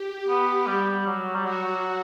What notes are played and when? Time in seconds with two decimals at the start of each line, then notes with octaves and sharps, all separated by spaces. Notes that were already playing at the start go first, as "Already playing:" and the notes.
Already playing: G4
0.28 B3
0.67 G3
1.07 F#3
1.35 G3
1.45 F#3 F#4